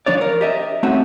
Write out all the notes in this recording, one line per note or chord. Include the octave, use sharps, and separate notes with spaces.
F3 D4 C#5 D5
A#4
G4 D#5 E5
A3 C4 C#4 D#4 F#4 E5